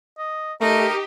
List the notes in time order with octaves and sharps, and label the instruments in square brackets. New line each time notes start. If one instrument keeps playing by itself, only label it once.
[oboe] D#5
[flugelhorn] A3 [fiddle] D#4 D#5 [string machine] G4 [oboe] A#4